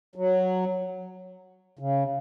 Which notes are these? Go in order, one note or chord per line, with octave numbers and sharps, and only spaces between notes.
F#3
C#3